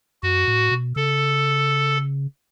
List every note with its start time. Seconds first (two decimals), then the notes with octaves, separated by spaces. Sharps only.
0.23 F#2 F#4
0.48 A2
0.71 B2
0.96 C#3 A4